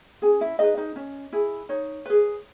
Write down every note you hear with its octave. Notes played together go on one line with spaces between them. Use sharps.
C#4 G#4 G#5
E4 E5
D#4 G#4 B4 D#5
D#4 D#5
C#4
E4 G#4
D#4 C#5
G#4 B4